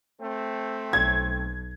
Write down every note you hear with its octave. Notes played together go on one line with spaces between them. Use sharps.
A3 C4
B1 G#6